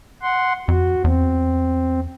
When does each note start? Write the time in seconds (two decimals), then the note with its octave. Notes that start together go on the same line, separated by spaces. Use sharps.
0.22 F#5 C6
0.68 F2 F#4
1.04 E2 C4